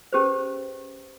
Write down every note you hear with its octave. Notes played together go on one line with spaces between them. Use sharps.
C#4 G4 G#4 B4 C5